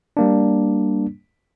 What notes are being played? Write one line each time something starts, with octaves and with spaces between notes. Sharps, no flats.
G3 A#3 D4